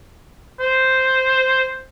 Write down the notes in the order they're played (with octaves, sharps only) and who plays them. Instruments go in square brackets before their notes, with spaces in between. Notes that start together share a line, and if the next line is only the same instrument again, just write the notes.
[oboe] C5